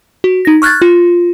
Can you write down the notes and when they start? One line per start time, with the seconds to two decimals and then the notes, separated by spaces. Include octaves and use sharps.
0.24 F#4
0.45 D#4 A#6
0.62 C#6 F6 F#6 G#6 A6
0.82 F4